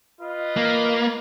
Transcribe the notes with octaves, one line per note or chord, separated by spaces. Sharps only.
F4 B4 D#5
A#3